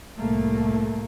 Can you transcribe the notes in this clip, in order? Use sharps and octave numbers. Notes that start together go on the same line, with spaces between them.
C2 A2 A3 A#3